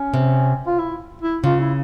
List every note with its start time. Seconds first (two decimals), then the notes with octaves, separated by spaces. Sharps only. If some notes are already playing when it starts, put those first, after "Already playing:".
Already playing: C#4
0.14 C3
0.67 F4
0.79 E4
1.22 E4
1.44 C#3 F4
1.60 E4